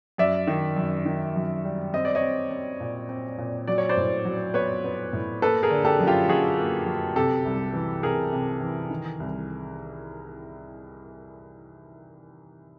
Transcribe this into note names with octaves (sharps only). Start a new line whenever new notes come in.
F#2 D5 E5
D#3
F#2
D#3
F#2
G3
C4 D#5
D5
C#5 D#5
C4
C4
A#2
C4
A#2
F#3 D5
C#5
C5 D5
A2
F#3
B3 B4 C#5
B3
A2
A#3 A4 B4
G#4 A#4
D3
G4 A4
F#2
F4 G4
F#2 F#4 G#4
A#3
F#3
C3 G4 A4
C2
E3
C3 G#4 A#4
C3
E3
D#3
C2